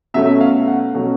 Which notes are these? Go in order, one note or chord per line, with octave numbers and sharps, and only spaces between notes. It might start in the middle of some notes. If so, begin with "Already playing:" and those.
B2 F#3 A3 C#4 E5
F5
F#5
B2 F#3 A3 C#4